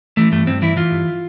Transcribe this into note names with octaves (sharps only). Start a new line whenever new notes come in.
E3 A3
G2 A3
G2 C4
E3 E4
E3 F4
G2